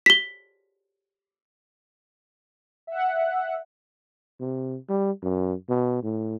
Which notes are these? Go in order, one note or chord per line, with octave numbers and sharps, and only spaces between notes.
B6 G7
E5 F#5
C3
G3
F#2
B2
A2